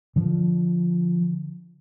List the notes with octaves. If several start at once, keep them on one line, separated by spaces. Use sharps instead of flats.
D3 F3